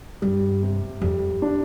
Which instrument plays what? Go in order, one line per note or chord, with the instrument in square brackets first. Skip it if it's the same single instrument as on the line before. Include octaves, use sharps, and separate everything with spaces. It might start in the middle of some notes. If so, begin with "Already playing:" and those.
[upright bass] G2 [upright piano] G3
[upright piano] C3
[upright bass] F2 [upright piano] G3
[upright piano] D4